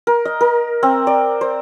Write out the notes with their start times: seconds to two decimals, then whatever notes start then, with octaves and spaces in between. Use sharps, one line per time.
0.07 A#4
0.25 D#5
0.41 A#4
0.83 C4
1.07 D5
1.41 C5